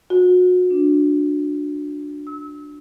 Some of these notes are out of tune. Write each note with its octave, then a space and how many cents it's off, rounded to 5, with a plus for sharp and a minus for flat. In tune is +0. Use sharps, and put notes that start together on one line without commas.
F#4 -30
D4 +5
E6 -35